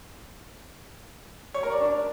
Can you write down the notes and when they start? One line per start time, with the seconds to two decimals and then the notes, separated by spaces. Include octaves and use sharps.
1.54 C#5
1.63 A#4
1.72 D5
1.80 D4